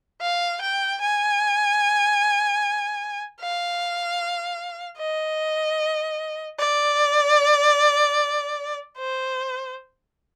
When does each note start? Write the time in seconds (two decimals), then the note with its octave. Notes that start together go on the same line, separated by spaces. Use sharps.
0.22 F5
0.61 G5
1.02 G#5
3.41 F5
4.99 D#5
6.59 D5
8.98 C5